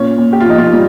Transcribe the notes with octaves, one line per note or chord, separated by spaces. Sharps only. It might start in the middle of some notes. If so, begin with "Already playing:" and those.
Already playing: A#2 C#4 C#5
A#2
G4
F4
F3
D#4
F3 F4
F3 G3